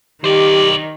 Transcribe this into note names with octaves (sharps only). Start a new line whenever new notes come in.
D#3 G4 C5 D5